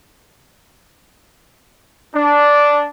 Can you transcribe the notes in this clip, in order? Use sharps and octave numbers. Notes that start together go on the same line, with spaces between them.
D4